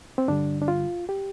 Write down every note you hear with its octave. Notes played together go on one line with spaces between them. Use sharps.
C4
G2 D3 G3 D4
D4
F4
G4